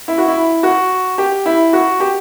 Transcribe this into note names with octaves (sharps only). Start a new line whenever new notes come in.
E4
F#4
E4
F#4
G4
E4
F#4
G4